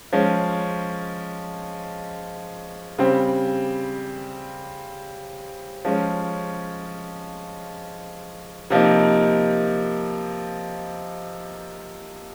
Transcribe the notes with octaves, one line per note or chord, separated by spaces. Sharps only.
F3 G#3 C#4
C#3 G3 C4
F3 G#3 C#4
C3 F3 A#3 D#4